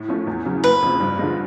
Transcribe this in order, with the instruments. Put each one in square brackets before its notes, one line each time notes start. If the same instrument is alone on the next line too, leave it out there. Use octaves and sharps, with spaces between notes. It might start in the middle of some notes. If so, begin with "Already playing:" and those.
Already playing: [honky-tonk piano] A2
F3 A3 C#4
E2
C#3 F#3
[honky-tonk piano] F#1 [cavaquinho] B4
[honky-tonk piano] F2 C#3
G2
D3 F3 G#3